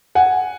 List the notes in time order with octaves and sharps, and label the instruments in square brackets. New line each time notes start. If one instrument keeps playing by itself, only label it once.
[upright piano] F#5 G#5